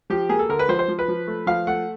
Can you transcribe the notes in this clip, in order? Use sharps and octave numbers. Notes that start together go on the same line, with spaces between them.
F3 G4
A#3 G#4
A4
D3 A#4
B4
F3 C5
C5
F3
B4
F3
A3
F3 F5
A3 F#5